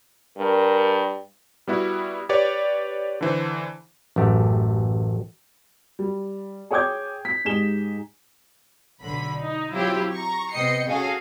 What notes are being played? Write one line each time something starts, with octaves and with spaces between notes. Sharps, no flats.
G2 A#4
G3 B3 E4 F#4
G4 B4 C#5 D5
D3 E3 C5
A1 F#2 A3 G4
G3
G#4 C#5 G5 D6 G6 G#6
B6
G#2 G4 G#4 E7 G7
B1 D3 B5
D#4
F#3 C4 E4 F4 G4
A#5 C#6
C3 B3 D#5 G5 C7 C#7
C#4 F#4 G#4 A4 F5